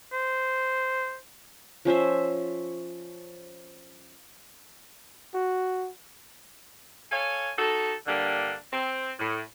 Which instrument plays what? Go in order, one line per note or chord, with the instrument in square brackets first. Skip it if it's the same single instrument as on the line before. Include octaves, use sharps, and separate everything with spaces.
[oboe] C5
[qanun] F3 C#4 C5 E5
[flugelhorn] F#4
[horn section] A4 C#5 F5 G#5
D#4 F#4 A4
G2 D3 G3 A#3 D4
C4
A2